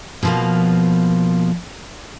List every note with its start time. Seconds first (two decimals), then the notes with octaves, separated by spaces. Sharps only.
0.23 B2 F3 A#3